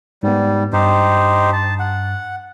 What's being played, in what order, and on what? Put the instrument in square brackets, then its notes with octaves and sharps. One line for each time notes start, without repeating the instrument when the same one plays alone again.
[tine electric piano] G#2 B3 [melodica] G3
[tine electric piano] G2 [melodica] D#4 G4 C5
[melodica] A5
F#5